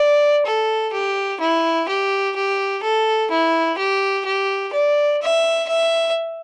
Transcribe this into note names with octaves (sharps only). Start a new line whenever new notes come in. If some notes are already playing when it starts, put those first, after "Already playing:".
Already playing: D5
A4
G4
E4
G4
G4
A4
E4
G4
G4
D5
E5
E5